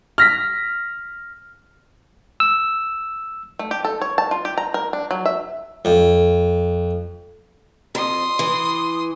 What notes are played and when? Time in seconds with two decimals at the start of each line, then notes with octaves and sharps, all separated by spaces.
0.18 F6 A#6 B6
2.40 E6
3.59 A3
3.71 G4
3.85 A4
4.01 C#5
4.18 A5
4.31 F4
4.45 G4
4.57 A#5
4.74 A#4
4.93 D4
5.11 F#3
5.25 E5
5.85 F2
7.95 F2 C6 D#6
8.39 E3